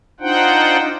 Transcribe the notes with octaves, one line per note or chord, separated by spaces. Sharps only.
D4 D#4 F4 C5 F#5 G5